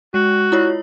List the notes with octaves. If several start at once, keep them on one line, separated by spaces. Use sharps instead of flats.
G#3 F#4
E4 F4 C#5